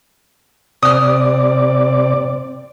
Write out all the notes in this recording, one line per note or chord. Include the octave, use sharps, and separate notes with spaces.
C3 D5 D#6 F6